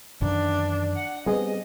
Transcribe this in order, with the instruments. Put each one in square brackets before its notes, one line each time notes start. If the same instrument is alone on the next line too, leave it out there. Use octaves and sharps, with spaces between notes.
[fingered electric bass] F#2 D#3 E3 [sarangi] D4
[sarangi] F#5
[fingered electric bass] G3 C4 [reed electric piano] B3 G#4 [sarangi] D#5